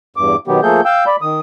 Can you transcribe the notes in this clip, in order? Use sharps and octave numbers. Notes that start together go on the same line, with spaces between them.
E2 G2 D6
B2 D#3 F#3 B3 G4
F3 A3 A#3 G#4 A4 G6
F5 G5 E6 G6
D5 B5
D#3 D#6